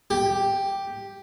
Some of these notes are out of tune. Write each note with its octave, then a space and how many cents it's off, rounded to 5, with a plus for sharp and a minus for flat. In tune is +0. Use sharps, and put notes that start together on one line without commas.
G4 +0